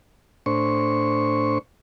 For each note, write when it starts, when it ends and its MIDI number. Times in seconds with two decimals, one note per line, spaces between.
0.46 1.58 45
0.46 1.58 62
0.46 1.58 72
0.46 1.58 85